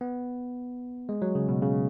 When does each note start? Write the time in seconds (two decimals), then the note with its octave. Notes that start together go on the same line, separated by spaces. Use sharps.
0.01 B3
1.09 G#3
1.22 F#3
1.35 C#3
1.48 B2
1.62 C#3